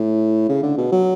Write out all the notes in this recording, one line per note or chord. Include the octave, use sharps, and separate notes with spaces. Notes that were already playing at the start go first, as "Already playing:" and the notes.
Already playing: A2
C#3
D3
B2
F#3